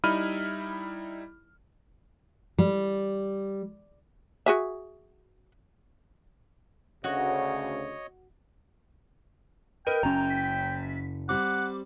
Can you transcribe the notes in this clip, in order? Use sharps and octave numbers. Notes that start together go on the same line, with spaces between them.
G3 D#4 E4 B5 F6 D#7
G3
F#4 G#4 E5
D2 C#3 F#4 C#5 D#5
A#4 B4 D#5 G5 D#7
F#1 F#2 C#4 A#5
B6
G3 C4 F#5 D6